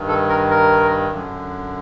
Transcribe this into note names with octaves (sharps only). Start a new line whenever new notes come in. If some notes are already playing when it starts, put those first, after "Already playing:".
Already playing: G2 D#3
A4
A#4
A#4
F#2 D3